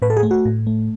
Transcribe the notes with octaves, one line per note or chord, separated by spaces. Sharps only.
A2 B4
A4
G#4
A3
F#4
A2
A3